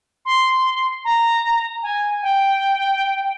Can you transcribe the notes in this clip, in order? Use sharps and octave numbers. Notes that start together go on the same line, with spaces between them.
C6
A#5
G#5
G5